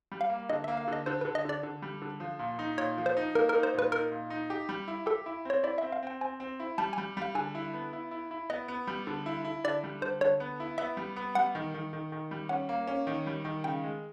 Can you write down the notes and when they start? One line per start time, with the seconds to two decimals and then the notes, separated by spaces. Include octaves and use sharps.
0.12 G3
0.21 F5
0.30 A#3
0.49 D3 D#5
0.64 A#3 E5
0.77 F5
0.88 D3 D#5
1.06 D3 C5
1.21 D3 B4
1.35 D#5
1.45 D3 D5
1.63 D3
1.82 G3
2.02 D3
2.20 F3
2.39 A#2
2.59 D#4
2.78 A#2 C#5
2.98 F3
3.06 C5
3.17 D#4
3.35 A#3 A#4
3.49 A#4
3.54 D#4
3.63 C5
3.74 A#2 B4
3.92 D#4 A#4
4.11 A#2
4.30 D#4
4.50 G4
4.69 G3
4.88 E4
5.06 G4 A4
5.26 E4
5.45 C4 C#5
5.63 E4 D5
5.78 C4 E5
5.92 F5
6.03 C4 G5
6.21 C4 G#5
6.40 C4
6.60 E4
6.78 G3 A5
6.93 G3 G#5
7.17 G3 F5
7.35 D3 G#5
7.55 E4
7.74 B3
7.93 E4
8.11 E4
8.31 E4
8.50 B3 D#5
8.68 B3
8.87 G3
9.07 D3
9.26 E4
9.45 E4
9.64 D3 D5
9.84 G3
10.02 D3 C5
10.21 D3 C#5
10.40 B3
10.60 E4
10.78 B3 E5
10.97 G3
11.16 B3
11.35 G3 F#5
11.55 D#3
11.74 D#3
11.93 D#3
12.12 D#3
12.31 G3
12.49 C#4 F#5
12.69 A#3
12.87 C#4
13.07 D#3
13.27 G3
13.45 D#3
13.64 C#3 G5
13.84 G#3